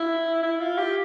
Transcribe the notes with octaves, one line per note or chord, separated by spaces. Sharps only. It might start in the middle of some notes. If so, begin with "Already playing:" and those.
Already playing: E4
E4
F4
G4